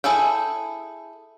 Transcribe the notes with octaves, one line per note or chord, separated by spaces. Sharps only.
E4 G#4 A4 G5